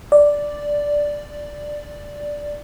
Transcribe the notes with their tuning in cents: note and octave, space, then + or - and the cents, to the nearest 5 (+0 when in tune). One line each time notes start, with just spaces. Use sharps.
D5 +0